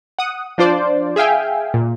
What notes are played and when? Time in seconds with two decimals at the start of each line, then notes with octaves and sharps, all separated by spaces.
0.19 F#5 D#6
0.58 F3 D4 F4 C5 D5
1.16 G#4 E5 F5 G5 G#5
1.74 A#2